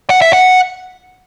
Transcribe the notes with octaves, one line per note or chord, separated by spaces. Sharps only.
F#5
E5
F#5